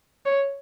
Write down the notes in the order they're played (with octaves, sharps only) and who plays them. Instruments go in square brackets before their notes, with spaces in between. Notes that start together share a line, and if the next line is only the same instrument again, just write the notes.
[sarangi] C#5